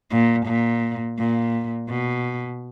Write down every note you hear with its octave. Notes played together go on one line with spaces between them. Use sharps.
A#2
A#2
A#2
B2